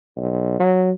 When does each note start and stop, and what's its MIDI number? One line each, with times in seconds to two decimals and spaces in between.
0.16 0.55 35
0.59 0.91 54